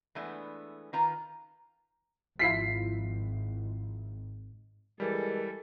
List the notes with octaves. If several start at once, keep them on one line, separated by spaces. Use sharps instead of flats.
E3 G#3 A3 B3 D4
D#3 F4 B4 A#5
G#1 F3 E4 F4 B6 C7
E3 G3 G#3 A4 A#4